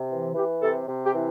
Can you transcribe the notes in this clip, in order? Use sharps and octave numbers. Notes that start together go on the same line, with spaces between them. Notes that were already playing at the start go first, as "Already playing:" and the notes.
Already playing: C3
E3
E3 G4
C3 A4
C3
G4
E3